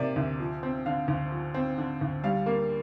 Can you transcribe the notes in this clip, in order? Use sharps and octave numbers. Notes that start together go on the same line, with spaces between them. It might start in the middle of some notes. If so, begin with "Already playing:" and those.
Already playing: C3 A#3 D5 E5
D2
F3
C4
D3 F5
D2
F3
C4
D3
D2
G3 F5
A#3